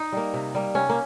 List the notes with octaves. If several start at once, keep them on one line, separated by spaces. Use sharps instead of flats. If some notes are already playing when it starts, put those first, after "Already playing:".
Already playing: D#4
G3 A#3
C3
G3 A#3
C3 C#4
A#3